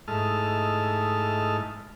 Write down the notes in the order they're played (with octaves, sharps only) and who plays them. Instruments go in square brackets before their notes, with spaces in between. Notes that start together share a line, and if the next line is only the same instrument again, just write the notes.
[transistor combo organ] G#2 A3 E4 D#5 A5 F6